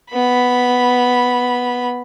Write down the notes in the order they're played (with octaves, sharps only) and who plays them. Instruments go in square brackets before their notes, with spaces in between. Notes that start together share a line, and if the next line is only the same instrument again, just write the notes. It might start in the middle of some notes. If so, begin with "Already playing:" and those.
[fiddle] B3 B5